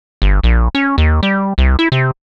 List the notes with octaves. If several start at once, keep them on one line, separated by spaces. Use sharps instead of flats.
G1
A#1
C#4
D#2
G3
C2
E4
C3